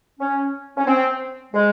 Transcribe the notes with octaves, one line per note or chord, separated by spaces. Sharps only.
C#4
C#4
C4
G#3